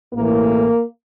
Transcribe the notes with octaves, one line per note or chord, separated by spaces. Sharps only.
A1 A2 E3 A#3